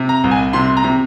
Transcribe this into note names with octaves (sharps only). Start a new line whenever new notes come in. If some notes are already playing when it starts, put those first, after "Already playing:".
Already playing: C3
A#5
C2
G#5
C3 C6
A#5
C3